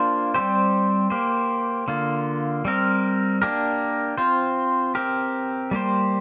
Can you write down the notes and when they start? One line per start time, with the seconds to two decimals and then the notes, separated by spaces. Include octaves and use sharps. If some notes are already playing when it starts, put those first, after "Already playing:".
Already playing: A#3 D4 F4 C5
0.34 G3 C4 G4 C5
1.10 A#3 G4 C5
1.88 D3 A#3 F4
2.65 G3 C4 A#4
3.42 A#3 D4 G4 A#4
4.18 C4 F4 C5
4.95 C4 G4 A#4
5.71 G3 A#3 G4 C5